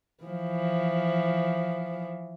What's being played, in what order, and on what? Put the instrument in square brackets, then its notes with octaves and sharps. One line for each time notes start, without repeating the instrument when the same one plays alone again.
[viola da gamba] E3 F3